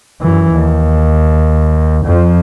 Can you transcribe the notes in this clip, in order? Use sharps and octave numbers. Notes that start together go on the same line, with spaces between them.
F#2 E3
D#2
F2 F3